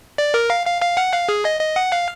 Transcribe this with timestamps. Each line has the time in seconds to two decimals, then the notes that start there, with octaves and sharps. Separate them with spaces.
0.18 D5
0.34 A#4
0.50 F5
0.66 F5
0.82 F5
0.97 F#5
1.13 F5
1.29 G#4
1.45 D#5
1.61 D#5
1.76 F#5
1.92 F5